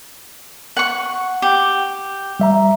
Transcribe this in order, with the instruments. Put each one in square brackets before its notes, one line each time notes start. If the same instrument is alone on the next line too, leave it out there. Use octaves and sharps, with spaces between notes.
[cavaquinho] F#5 C#6
G4
[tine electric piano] G3 E5 A#5